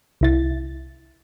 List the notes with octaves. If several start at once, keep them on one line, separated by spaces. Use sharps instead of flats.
C2 E4 A6